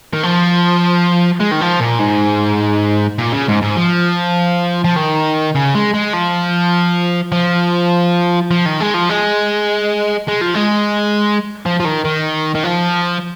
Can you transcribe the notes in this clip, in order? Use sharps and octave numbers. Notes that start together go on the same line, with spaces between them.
D#3
F3
G#3
D#3
F3
A#2
G#2
A#2
C#3
G#2
G#2
F3
F3
D#3
C#3
G#3
G#3
F3
F3
F3
D#3
G#3
F3
G#3
G#3
F3
G#3
F3
F3
D#3
D#3
D#3
F3